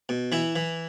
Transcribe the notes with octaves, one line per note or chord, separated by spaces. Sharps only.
B2
E3 E4
E3